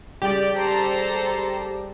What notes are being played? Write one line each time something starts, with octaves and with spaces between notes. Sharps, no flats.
C#3 G3 G4 D5
A4 C5 A#5